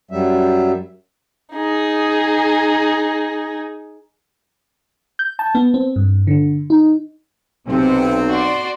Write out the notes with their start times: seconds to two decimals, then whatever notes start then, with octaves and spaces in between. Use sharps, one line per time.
0.11 F#2 F#3 G3 E5
1.53 D#4 G#4
5.19 G6
5.39 A5
5.55 B3
5.74 C4
5.96 G2
6.27 D3
6.70 D#4
7.68 B1 C3 C4
8.29 F#4 D5 C6